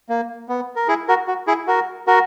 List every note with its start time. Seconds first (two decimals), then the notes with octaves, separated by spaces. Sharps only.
0.09 A#3
0.49 B3
0.76 A#4
0.88 E4 G#4
1.08 F#4 A#4
1.28 F#4
1.47 E4 G#4
1.67 F#4 A#4
2.07 F#4 A#4